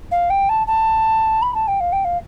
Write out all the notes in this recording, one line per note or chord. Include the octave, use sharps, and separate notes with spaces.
F5
G5
A5
A5
B5
A5
G5
F5
G5
F5